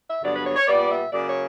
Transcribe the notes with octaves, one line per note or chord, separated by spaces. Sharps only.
E5
G2 D3 F#3 B3 D5
B4
C#5
C#5
A#2 G3 B3 D5
E5
C#3 F#3 A#3 D5
C#5